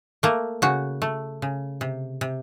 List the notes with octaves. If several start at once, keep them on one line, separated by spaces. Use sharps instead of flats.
A3 A#3
C#3 F#4
A3
C#3
C3
C3